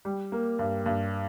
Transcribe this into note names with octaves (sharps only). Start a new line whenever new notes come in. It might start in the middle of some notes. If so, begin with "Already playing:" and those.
G3
A#3
G2
G2